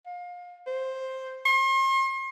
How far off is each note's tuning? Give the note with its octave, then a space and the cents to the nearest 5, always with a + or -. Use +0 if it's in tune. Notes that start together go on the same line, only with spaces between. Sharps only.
F5 +30
C5 +5
C6 +40